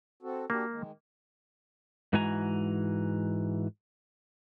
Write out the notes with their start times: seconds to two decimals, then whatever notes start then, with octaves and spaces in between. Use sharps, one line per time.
0.23 C4 F#4 A4
0.50 A#3 D4 F#4 G4
0.70 D#3 G#3
2.13 G#2 E3 G#3 F#4 G#5 A#5